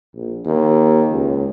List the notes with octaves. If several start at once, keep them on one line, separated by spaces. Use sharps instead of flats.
A#1
D#2
C#2